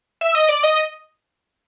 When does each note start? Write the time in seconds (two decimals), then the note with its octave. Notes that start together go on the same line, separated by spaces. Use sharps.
0.21 E5
0.35 D#5
0.49 D5
0.63 D#5